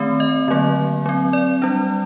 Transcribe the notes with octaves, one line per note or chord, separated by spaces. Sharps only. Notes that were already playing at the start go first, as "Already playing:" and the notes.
Already playing: D#3 A3 C4
D#5
D3 F#3 A#3
F#3 C4
D5
G3 D4